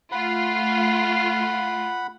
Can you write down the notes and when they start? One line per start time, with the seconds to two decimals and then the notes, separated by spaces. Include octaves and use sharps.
0.12 A3 F4 F#5 B5